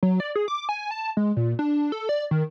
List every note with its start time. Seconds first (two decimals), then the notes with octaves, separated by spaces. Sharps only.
0.03 F#3
0.20 D5
0.35 G#4
0.48 D6
0.69 G#5
0.91 A5
1.17 G#3
1.37 A#2
1.59 D4
1.92 A4
2.09 D5
2.31 D#3